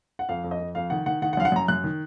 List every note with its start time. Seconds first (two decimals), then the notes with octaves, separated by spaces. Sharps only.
0.19 F#5
0.29 F2 F5
0.44 F2
0.51 D#5
0.60 F2
0.75 F2 F5
0.90 D#3 F#5
1.06 D#3 F#5
1.22 D#3 F#5
1.33 F#5
1.37 F#2 F5
1.45 F#5
1.52 F#2 A#5
1.68 F#2 F#6
1.84 D#3